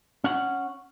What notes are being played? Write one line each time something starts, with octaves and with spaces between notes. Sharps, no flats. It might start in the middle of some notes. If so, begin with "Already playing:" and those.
C#4 F#5